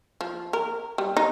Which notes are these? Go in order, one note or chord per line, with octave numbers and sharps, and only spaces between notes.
F3
A#4
G3
D#4